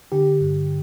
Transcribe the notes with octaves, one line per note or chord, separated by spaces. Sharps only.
D3 G4
G2